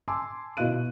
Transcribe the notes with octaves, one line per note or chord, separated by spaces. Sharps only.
G#5 A5 C6 D6 E6
B2 E4 F5 F#6 D#7